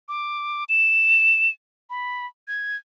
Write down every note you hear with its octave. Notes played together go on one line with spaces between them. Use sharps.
D6
E7
B5
G#6